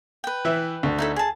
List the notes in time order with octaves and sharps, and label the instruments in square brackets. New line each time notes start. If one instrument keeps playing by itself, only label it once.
[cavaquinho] B4 G5
[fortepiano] E3 E5
D2
[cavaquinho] D#4 E4 A4
G#4 A5